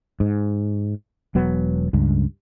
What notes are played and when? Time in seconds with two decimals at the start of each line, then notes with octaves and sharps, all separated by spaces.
0.20 G#2
1.35 E1 F#3 B3
1.93 C#2 G2